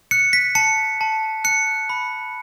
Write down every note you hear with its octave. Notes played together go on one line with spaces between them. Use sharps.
F#6 C#7
B6
A5 C#7
A5
F#6 C#7
B5